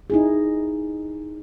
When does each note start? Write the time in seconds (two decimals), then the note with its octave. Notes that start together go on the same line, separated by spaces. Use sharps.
0.10 D#4 E4 G#4